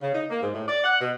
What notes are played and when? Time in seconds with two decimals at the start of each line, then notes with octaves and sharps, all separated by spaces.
0.02 C#3
0.15 D#4
0.30 A#3
0.42 G#2
0.54 A2
0.67 D5
0.84 F#5
1.00 B2